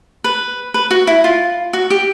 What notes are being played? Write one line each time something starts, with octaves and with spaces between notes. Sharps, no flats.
B4
B4
F#4
E4
F4
F#4
G4